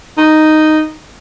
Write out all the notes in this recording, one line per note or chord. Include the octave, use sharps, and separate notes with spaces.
D#4